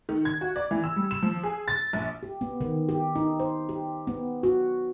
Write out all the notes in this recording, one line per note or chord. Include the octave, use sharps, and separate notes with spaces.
D#3
G#6
F#4
D5
E3
E6
G3
E7
F3
G#4
A6
A#1
G4
B3
D#3
G4
D#4
C5
G4
B3
F#4